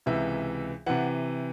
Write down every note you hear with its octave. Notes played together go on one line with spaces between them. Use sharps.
C#2 C3 E3 E5
C3 E3 F#5